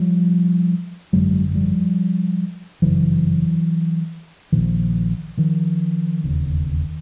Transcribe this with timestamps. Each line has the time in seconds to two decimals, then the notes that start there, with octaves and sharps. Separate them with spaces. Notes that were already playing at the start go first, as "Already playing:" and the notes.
Already playing: F3 G3
1.13 G#1 F#2 D3 F#3 G#3
1.54 F3 G3
2.82 G1 F#2 C#3 E3 F#3
4.52 A#1 A#2 D#3 F3
5.37 D#3 F3
6.24 E1 D#2 C#3